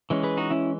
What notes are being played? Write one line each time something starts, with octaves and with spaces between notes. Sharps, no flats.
E3 G#3 C#4
G#4 B4
D#4 F#4
C#4 E4